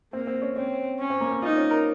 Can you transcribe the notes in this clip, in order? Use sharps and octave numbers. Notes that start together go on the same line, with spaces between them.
A#3 C4
C4
C#4
C4 C#4
C#4
C4
A#3
C4
D#4 F4
C#4
A#4